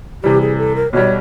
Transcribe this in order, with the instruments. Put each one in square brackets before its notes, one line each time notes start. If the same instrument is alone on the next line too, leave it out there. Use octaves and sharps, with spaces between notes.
[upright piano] C3 E3 G3 [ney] G4
[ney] G#4
A4
A#4
[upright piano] B1 B2 G3 [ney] C#5